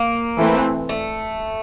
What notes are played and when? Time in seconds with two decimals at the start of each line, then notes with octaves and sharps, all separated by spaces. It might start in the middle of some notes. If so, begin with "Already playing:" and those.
Already playing: A#3
0.38 E3 A3 C4
0.89 A3